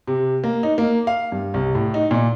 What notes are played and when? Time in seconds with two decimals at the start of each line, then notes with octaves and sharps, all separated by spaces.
0.07 C3
0.44 A#3
0.63 D#4
0.78 A#3
1.07 F5
1.32 G2
1.54 C2
1.75 A2
1.94 D#4
2.11 A#2